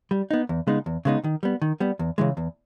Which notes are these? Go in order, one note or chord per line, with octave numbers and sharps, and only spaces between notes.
G3
B3 D#4
E2
C#3 G#3 B3 D#4
E2
C#3 G#3 B3 D#4
D#3
G3 B3
D#3
G3 B3
E2
C#3 E3 G#3
E2